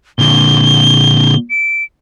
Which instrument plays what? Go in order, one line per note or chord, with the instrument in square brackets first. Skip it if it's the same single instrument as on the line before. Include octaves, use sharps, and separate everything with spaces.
[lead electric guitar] A#2 D3 [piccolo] G7
[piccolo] D7